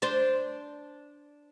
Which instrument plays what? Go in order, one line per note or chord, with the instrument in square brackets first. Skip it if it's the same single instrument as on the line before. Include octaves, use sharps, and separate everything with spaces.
[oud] D4 C5